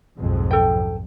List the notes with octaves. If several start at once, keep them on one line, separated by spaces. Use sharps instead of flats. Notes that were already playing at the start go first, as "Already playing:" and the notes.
B1 F2 G#2
A4 G5